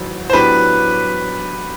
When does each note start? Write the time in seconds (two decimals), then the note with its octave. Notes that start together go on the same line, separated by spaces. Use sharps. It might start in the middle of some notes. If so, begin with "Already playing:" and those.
Already playing: A1 G#2 D#3 F#3
0.30 C5
0.33 A2 F#3 B3 D4 G4 B4